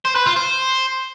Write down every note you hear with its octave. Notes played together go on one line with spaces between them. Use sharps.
C5
B4
F4
C5